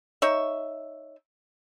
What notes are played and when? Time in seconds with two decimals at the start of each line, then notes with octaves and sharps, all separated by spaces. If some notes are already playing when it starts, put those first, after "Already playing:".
0.22 D#4 C#5 E5